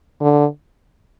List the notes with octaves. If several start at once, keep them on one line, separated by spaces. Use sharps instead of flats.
D3